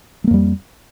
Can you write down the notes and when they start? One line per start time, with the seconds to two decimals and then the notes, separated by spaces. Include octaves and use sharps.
0.24 G#3
0.27 A#3
0.31 F2
0.34 G3